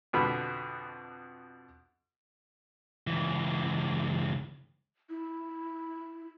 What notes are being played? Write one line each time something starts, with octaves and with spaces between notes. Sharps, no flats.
F2 B2 D3 B5
C#2 E3
E4